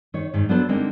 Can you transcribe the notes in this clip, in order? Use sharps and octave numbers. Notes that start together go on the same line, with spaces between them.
D#3 C#5
G#2 D#3
F#3 B3 D4 A4 C5
D3 G#3 A#3 C4 D#4 A#4